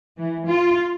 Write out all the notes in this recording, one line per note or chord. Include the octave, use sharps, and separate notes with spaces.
E3
F4